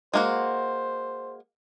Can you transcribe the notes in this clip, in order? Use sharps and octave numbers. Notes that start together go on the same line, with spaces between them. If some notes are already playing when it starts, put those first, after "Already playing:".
G#3 A#3 F#4 C5